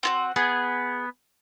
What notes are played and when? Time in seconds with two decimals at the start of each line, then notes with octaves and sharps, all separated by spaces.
0.03 C4 F4 F#4
0.36 B3 G#4